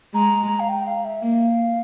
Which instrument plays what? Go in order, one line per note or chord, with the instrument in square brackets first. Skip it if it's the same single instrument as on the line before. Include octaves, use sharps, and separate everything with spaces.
[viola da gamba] G#3 [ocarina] A#5
[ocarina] F5
G5
F5
E5
[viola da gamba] A#3 [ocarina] F5